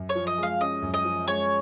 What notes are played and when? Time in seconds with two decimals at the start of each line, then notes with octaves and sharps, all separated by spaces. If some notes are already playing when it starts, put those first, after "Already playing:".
Already playing: F#2
0.09 C#5
0.15 F3
0.27 D#5
0.38 G#3
0.43 F5
0.60 C#4 D#5
0.82 F#2
0.94 D#5
1.05 F3
1.27 G#3 C#5